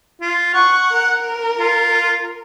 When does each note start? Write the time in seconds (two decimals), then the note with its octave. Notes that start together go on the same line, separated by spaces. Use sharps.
0.21 F4
0.55 F#5 C#6
0.91 A#4
1.58 F4